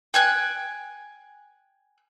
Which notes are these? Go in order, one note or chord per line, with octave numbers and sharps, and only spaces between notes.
G5 G#5 F#6